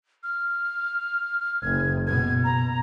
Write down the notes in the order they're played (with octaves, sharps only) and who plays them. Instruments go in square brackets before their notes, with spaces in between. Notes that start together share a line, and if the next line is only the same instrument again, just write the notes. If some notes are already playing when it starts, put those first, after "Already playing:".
[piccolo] F6
[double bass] F#1 [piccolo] G#6
[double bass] B2 [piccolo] G#6
[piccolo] A#5